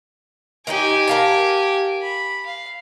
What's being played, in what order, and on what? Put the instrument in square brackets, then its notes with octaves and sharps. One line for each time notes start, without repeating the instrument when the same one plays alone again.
[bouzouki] D#3 D#4 G5 [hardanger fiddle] G4 G#5
[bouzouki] A#4 F5 A5
[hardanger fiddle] B5
F5